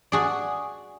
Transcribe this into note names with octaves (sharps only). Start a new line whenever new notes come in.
F#4 G#4 D5